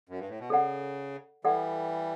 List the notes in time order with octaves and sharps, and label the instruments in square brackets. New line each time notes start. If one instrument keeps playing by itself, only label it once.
[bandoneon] F#2
G2
A2
B2
[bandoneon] C#3 [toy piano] A4 D5 F#5
[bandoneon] E3 G3 [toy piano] A4 D5 F#5